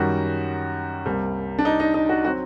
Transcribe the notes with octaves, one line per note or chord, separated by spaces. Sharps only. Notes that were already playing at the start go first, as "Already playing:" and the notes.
Already playing: F#2 D#3 G3 F#4
C2 C3 G3 A#3
D4
D#4
D#4
D#4
F#4
F#3 C4 F#4